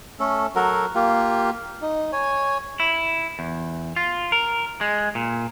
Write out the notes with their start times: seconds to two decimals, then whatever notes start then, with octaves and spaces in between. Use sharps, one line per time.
0.20 A3 C#4 A4
0.55 F#3 F#4 A4 A#4
0.95 A#3 F4 G4
1.82 D#4
2.13 C#5 G#5
2.80 E4
3.39 E2
3.96 F4
4.32 A#4
4.81 G#3
5.15 A#2